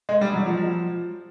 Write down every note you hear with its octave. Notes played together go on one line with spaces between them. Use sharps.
G#3
G3
F#3
F3